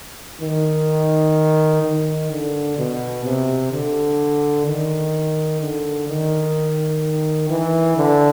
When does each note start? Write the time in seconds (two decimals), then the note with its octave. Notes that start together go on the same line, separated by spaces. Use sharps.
0.41 D#3
1.83 D#3
2.31 D3
2.78 B2
3.24 C3
3.72 D3
4.67 D#3
5.61 D3
6.08 D#3
7.50 E3
7.97 D3